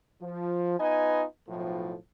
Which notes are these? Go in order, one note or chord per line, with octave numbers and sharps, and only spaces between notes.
F3
B3 D#4 F4 B4 D#5 G#5
B1 A2 F3